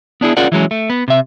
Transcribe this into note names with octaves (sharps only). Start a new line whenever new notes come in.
B3 D4 E4 G#4
C#4 F4 G#4 A#4 D5 F#5
E3 F#3 G#3 C#4
A3
B3
C3 E5